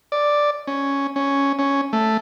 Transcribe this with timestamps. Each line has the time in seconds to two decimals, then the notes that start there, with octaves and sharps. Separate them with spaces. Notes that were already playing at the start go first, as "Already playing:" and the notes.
0.12 D5
0.67 C#4
1.16 C#4
1.59 C#4
1.93 A3